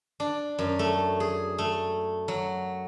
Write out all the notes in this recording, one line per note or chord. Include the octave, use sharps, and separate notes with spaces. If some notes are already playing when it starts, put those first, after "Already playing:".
D4
F#2
A3
G#4
A3
F#3